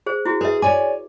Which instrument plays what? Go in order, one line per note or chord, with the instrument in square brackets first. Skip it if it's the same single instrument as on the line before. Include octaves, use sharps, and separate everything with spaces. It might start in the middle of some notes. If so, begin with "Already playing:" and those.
[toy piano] G#4 C5
E4 F#4 G#4
[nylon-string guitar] G#4 [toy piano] B4 E5
[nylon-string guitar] C#5 D5 G#5 [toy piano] D6